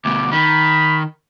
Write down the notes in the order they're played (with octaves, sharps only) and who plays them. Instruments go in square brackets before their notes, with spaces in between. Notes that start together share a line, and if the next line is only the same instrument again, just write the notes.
[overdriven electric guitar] D2 B2 [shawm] D6
[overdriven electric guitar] D#3 [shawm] B5